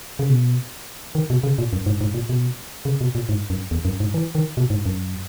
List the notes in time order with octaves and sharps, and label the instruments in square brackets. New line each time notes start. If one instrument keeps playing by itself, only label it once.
[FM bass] C#3
B2
D#3
B2
C#3
A#2
F#2
G#2
G#2
A#2
B2
C#3
B2
A#2
G#2
F#2
E2
F#2
G#2
E3
D#3
B2
G#2
F#2